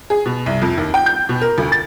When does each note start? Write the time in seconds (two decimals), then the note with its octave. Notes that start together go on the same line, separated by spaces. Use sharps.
0.10 G#4
0.26 B2
0.46 C2
0.62 F2
0.78 D#2
0.94 G5
1.06 G6
1.29 B2
1.41 A#4
1.58 D2
1.72 A6